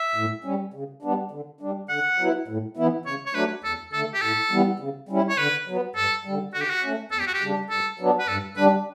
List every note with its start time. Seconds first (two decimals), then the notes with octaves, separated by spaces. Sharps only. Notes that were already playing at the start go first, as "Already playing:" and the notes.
Already playing: E5
0.15 A2
0.44 G3 C#4
0.74 C#3
1.02 G3 B3 D4
1.31 D3
1.61 G3 D4
1.89 D3 F#5
2.18 F#3 B3 E4
2.48 A2
2.77 E3 B3 E4
3.05 C#3 C#5
3.26 C#5
3.34 F#3 A3 D4 B4
3.64 E2 A4
3.93 D3 A3 A4
4.14 G4
4.21 A2 A4
4.51 E3 G3 B3
4.79 C#3
5.09 G3 C#4 E4
5.29 C#5
5.37 D3 B4
5.67 F#3 B3
5.96 G2 A4
6.25 D3 G3
6.54 D3 F#4
6.62 G4
6.70 F#4
6.83 A3 C#4
7.12 E2 A4
7.20 G4
7.27 F#4
7.34 G4
7.41 C#3 G3 D4
7.70 G2 A4
7.99 F#3 B3 D4
8.19 B4
8.28 G2 A4
8.56 D3 G3 D4 B4